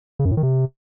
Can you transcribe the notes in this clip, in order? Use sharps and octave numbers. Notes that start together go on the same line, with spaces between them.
C#3
F#2
A2
D#3
C3